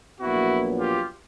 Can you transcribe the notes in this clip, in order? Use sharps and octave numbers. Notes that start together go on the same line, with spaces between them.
A#1 A#2 F#3 B3 E4 F#4
F4 G4